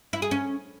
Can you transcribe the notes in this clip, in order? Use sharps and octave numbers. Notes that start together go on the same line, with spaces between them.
E4
G#4
C#4